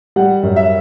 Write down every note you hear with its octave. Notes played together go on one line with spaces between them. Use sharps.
G3 F#5
F#2
E5